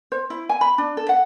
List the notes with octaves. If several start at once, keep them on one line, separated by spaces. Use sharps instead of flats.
C5
E4
G#5
B5
D4
A4
F#5